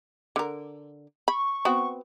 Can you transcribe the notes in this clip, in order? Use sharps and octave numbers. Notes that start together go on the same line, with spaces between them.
D3 A#4
B5 C#6
B3 C4 F#4